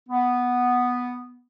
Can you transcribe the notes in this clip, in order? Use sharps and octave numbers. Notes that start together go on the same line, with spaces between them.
B3